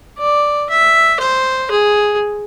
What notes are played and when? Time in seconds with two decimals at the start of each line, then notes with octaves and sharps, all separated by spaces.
0.19 D5
0.70 E5
1.20 C5
1.71 G#4